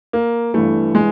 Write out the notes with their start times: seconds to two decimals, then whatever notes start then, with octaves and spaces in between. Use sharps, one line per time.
0.13 A#3
0.54 G1 G2 E3 A3
0.95 G#3